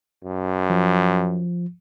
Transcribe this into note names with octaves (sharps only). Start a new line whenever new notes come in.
F#2
F3